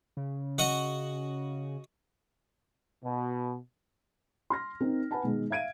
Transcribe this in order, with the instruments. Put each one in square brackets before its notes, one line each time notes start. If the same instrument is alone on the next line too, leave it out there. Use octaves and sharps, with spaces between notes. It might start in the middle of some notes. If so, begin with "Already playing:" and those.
[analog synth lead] C#3
[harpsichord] F#4 D#5 F#5
[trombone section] B2
[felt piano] C6 F6 A#6
C4 D#4 A#4
B4 F#5 G#5 A5 B5
B2 D#3 G#3
E5 F5 G#6 D7 D#7